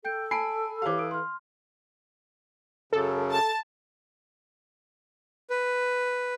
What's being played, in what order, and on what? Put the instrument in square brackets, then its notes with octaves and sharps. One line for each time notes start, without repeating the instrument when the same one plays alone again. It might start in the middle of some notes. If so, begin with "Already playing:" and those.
[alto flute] A4 [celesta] G5 G6 D7
[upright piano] G#5 B5 C7 [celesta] A5 D7
[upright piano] E3 F5 [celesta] G4 C#5 D6
[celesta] D#6 D7
C6 F6
[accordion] F#2 C#3 [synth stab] A4
[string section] A5
[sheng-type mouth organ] B4